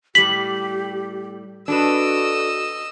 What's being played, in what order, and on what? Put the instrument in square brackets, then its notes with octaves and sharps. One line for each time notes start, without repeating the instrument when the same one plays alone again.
[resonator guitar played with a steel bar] A2 G3 [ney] G4 [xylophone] B6 F#7
[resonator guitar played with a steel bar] D4 A4 B4 [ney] F#4 [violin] D#5 E6